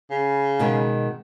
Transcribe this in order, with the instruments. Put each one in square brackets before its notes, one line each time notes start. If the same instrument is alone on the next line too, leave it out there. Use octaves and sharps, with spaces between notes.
[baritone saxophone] C#3
[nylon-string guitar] B2 D#3 G#3